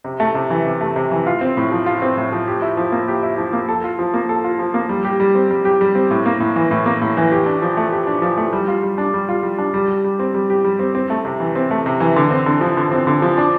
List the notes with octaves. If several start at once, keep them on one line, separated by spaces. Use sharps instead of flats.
C3
A3
C3
E3
C3
A3
C3
E3
F4
C4
A2
F3
F4
C4
A2
F3
G4
E4
F3
A#3
G4
E4
F3
A#3
A4
F4
F3
A#3
A4
F4
F3
A#3
G3
G4
G3
C4
G3
G4
G3
C4
A2
A#3
A2
E3
A2
A#3
A2
E3
G4
D4
F3
A3
G4
D4
F3
A3
G3
F4
G3
D4
G3
F4
G3
D4
G3
G4
G3
C4
G3
G4
G3
C4
C4
A3
C3
E3
C4
A3
C3
E3
D3
C4
D3
F3
D3
C4
D3
F3
D4